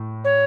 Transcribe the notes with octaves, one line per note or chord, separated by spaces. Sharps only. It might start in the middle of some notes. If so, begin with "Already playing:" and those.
Already playing: A2
C#5